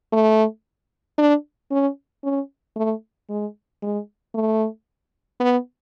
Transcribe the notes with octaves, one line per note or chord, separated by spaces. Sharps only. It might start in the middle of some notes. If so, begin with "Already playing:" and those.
A3
D4
C#4
C#4
A3
G#3
G#3
A3
B3